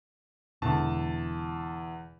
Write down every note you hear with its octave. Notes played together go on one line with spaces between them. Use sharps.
E1 E2 D3 A5